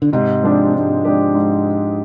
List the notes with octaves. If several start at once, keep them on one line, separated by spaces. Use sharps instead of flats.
D3
G#2 C3
F3 G#3 D4 G4
G#2
F3 G#3 D4 G4
G#2